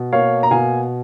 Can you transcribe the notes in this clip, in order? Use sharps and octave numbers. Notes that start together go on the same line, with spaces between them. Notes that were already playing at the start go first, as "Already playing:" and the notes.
Already playing: B2
A#3 C#5 F5
A#5
B2 F5 G#5